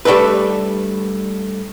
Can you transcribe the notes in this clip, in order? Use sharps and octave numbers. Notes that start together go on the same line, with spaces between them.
G3 A3 D4 A4 B4